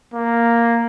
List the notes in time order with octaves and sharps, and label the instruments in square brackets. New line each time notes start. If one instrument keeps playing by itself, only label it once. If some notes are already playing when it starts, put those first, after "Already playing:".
[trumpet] A#3